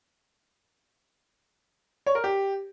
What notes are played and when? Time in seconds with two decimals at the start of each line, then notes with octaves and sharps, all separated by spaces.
2.06 C#5
2.15 A#4
2.24 G4